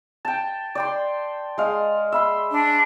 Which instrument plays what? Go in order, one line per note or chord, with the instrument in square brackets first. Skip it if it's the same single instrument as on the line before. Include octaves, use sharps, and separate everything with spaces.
[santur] G5 A5
D5 G5 C6
G#3 F5
E5 B5 C6
[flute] D4